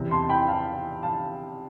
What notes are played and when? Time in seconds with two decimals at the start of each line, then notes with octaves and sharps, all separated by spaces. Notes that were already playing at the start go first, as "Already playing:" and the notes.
Already playing: E2 C3 E3
0.11 A5 C6
0.29 G5 B5
0.48 F5 A5
1.03 F5 A5